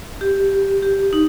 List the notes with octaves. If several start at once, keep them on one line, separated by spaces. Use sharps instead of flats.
G4
G4
D#4